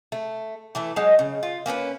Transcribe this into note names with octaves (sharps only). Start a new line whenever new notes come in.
A3
E3 A3 A4
F#3 G#3 D#4 A5
C#3
F4
A#3 C#4 G#4 B4